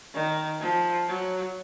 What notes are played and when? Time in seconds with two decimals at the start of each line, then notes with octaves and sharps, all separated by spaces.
0.14 D#3
0.60 F3
1.08 F#3